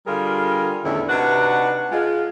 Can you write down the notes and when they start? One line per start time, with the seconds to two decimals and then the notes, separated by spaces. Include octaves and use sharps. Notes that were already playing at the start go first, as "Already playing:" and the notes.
0.07 D3 G3 F4 G#4 A#4
0.85 E2 A2 D3 D#3 C#4 E4
1.09 C3 D4 D#4 F#4 B4 F#5
1.92 G#3 F4